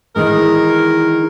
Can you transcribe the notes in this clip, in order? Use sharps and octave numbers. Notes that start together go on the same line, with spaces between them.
D#3 E3 G#3 A#4